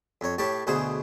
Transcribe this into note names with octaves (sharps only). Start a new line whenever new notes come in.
F2 C#5
A2 G4 C#5 A5
D2 B2 G#4 C5